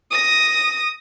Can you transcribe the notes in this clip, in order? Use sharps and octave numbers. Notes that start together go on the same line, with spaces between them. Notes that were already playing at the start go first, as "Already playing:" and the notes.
D#6 A#6